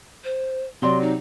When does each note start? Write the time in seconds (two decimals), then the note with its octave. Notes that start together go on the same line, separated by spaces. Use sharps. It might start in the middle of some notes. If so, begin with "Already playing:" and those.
0.24 C5
0.82 C3 F#3 D5 C6
1.01 D#4